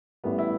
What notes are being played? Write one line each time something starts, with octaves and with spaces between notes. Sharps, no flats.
A1 A2 G3 B3
E4